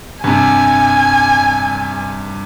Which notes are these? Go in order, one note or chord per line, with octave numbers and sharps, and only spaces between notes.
G2 C3 G#5